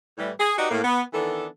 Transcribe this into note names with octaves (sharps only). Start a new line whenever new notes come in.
A2 E3 G3
G#4
D#4 F#4 G4 B4 D5 D#5
A2 A#3
B3
D#3 E3 B3 D4 A4